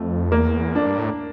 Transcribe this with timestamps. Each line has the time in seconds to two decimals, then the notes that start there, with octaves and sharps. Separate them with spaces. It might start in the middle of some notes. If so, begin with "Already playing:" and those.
Already playing: F2 A3
0.32 E2 A#3
0.75 F2 D4
0.87 G2
0.98 A2